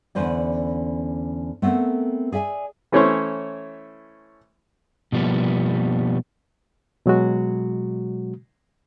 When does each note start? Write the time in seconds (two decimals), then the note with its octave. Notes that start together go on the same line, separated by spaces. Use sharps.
0.15 E2 D3 C#4 B4 C5 D5
1.62 A3 B3 C4 A4 A#4
2.32 G#4 D5 E5 G#5
2.92 E3 A3 C#4 E4 C5 C#5
5.12 B2 F3 G3 A#3 B3
7.06 B2 F#3 G#3 F#4